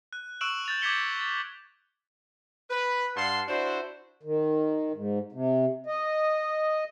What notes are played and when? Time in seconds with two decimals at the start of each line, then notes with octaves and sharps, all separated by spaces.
0.13 F#6
0.41 C#6 E6 F#6 D7 E7 F#7
0.66 G6 A6 F7
0.81 D6 G6 G#6 B6 C#7 G7
1.20 A6
2.71 B4
3.17 G2 F5 F#5 A5 C6
3.49 D4 E4 F#4 C5
4.23 D#3
4.94 G#2
5.32 C3
5.86 D#5